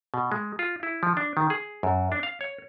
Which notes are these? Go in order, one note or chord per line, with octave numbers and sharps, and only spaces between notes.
B2
G#3
F4
E4
F3
D4
D#3
G#4
F#2
D4
F5
C#5